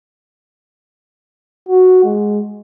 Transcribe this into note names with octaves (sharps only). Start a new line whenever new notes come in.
F#4
G#3